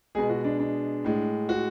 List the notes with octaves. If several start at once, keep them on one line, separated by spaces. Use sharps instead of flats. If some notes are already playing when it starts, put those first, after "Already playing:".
B2 G#3 G#4
F#4
D4
D4
A2 G#3
F#4